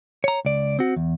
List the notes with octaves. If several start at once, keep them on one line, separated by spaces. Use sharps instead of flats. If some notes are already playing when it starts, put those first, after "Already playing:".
C#5 A#5
C#2 D5
C4 F#4
E2